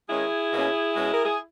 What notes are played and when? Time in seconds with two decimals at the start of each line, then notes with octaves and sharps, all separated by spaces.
0.10 D#3 G#3 C#4 E4 G#4
0.53 B2 A#3 C#4
0.95 B2 G#3 C#4
1.12 A#4
1.25 G#4